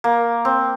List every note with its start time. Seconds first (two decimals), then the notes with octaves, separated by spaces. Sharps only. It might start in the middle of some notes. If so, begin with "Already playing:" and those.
0.04 A#3
0.45 C4